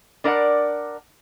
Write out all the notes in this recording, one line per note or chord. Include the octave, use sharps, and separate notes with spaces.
D4 A#4 D5 D#5 F#5